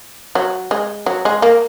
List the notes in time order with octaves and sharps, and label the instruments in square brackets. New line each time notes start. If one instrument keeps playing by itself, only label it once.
[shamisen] F#3
G#3
F#3
G#3
A#3